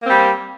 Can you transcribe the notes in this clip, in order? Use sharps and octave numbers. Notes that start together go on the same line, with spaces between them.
G3 A#3 C4